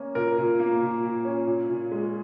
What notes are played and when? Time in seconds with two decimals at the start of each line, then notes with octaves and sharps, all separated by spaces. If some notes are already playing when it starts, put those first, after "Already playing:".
Already playing: A#3 C#4
0.15 A#2 A#4
0.38 A#2
0.60 A#3
0.82 A#2
1.03 A#2
1.25 C#4
1.47 A#2
1.70 A#2
1.92 G#3